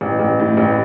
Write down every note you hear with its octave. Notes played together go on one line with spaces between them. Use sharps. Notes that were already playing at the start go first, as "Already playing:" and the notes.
A1
A1
A2
A1